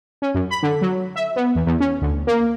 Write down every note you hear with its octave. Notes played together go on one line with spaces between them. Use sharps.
C#4
F#2
B5
D3
F#3
E5
B3
E2
E2
C#4
D2
A#3